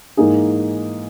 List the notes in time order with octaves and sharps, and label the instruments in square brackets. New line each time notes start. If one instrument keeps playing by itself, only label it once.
[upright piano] G#2 E3 A#3 D#4 G#4